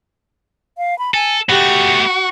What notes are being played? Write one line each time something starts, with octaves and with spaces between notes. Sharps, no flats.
F5
B5
A4 G#5
A3 B3 F#4 G4